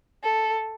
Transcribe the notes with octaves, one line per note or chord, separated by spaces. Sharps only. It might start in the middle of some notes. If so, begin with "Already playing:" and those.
A4